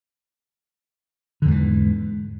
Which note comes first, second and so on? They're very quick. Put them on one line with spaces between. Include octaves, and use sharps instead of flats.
D3 E2 G#2 E3